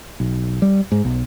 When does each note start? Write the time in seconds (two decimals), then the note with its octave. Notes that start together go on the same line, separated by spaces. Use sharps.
0.20 B1
0.62 G3
0.92 G#2
1.05 B1